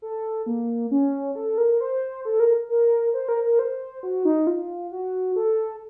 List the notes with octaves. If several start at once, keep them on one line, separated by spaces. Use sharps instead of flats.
A4
A#3
C#4
A4
A#4
C5
A4
A#4
A#4
C5
A#4
A#4
C5
F#4
D#4
F4
F#4
A4